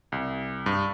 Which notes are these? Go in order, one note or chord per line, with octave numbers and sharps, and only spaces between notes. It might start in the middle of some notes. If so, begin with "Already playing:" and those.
C2
G2